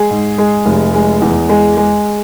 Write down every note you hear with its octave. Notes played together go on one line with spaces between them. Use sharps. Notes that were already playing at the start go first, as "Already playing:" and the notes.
Already playing: G#3 G#4
G#2
G#3
F1
G#3
E2
G#3
G#3